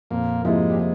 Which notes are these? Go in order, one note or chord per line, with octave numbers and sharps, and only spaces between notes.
F2 A#2 A#3
G#2 C3 F3 G#3 A#3 E4
G3
G#3